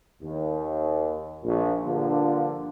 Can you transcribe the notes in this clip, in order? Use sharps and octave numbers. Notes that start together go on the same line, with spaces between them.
D#2
A#1
G2 D3 F3 A#3 D4